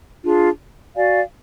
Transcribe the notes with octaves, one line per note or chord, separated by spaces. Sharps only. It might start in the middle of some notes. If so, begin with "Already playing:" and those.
D4 F4 G#4
F#4 D5 F5 G#5